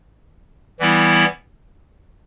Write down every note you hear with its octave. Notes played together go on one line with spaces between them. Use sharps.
E3 G3 B3 E4